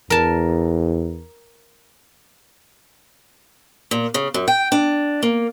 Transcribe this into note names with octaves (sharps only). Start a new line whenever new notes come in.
E2 A#4 A5
A#2
C#3
F#2
G5
D4
A#3